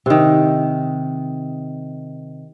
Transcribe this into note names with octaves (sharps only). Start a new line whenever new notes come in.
C3 D#3